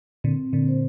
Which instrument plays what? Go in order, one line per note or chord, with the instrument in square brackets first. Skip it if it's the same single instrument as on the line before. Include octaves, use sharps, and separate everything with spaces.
[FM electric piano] A#2 D3 [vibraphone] C4
[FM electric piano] A#2 D3
[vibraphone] C5